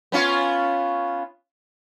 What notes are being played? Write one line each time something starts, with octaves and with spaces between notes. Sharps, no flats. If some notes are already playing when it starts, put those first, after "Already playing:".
B3 C#4 F4